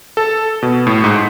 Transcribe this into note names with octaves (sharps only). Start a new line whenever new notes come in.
A4
B2
A2
G#2